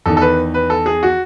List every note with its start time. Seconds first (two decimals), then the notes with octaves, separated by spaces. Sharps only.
0.06 E2 D#3 A4
0.17 A4
0.21 B4
0.54 B4
0.70 A4
0.86 G#4
1.03 F#4